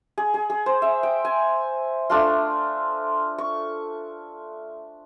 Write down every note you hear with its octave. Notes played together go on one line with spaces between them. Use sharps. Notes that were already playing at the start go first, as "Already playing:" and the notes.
G#4
G#4
G#4
C5
E5
G5
G#5
A3 D4 F4 C6
C#6